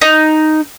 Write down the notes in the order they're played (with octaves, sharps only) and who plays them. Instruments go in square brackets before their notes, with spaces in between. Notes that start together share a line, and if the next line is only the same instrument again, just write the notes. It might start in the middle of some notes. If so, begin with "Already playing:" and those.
[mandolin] D#4